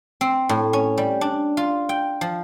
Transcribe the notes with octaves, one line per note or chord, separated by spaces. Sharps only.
C4
A2
C#4
G3
D4
F4
G5
F3